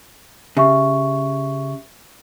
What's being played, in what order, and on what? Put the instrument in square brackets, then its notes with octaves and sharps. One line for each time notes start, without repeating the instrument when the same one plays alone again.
[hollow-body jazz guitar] C#3 [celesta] G4 E5 C#6